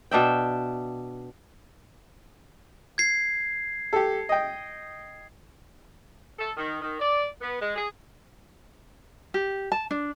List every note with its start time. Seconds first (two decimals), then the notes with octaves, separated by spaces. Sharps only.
0.11 B2 D4 E5 G5
2.98 G#6 C7
3.93 G4 A4
4.29 D#5 G5
6.39 A4
6.57 D#3
6.81 D#3
7.00 D5
7.41 B3
7.60 G#3
7.76 G#4
9.34 G4
9.72 A5
9.91 D4